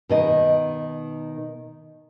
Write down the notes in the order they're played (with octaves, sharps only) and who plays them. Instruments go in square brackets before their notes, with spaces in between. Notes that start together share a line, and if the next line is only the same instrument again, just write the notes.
[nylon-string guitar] B2 D#3 D#5